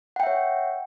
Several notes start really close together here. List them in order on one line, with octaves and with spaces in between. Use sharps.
F#5 G5 E5 C#5